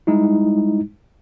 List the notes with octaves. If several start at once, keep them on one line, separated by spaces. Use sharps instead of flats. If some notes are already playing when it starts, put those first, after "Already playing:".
G3 G#3 D#4 E4